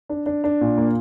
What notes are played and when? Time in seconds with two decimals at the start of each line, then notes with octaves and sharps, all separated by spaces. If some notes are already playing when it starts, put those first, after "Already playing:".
0.09 D4
0.26 D4
0.44 D4
0.61 A#2
0.78 A#3